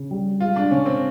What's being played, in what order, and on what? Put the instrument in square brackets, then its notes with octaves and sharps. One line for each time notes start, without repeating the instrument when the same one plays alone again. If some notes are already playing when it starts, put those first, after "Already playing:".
Already playing: [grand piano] C#3
G3
[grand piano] G#3 [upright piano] F4
[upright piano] D4
[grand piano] C#3 [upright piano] C#4
[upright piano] C4